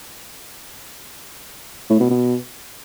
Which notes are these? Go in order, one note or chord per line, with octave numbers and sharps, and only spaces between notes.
A2
B2
B2